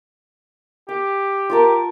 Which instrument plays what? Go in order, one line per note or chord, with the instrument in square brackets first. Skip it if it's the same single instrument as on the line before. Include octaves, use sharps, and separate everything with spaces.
[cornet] G4 [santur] D6
[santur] F4 A#4 A5